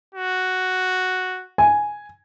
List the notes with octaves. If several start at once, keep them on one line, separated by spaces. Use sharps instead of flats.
F#4
G#5